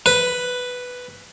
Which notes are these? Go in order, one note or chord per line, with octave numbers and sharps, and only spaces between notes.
B4